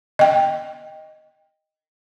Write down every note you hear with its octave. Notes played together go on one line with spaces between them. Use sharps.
D#5 G5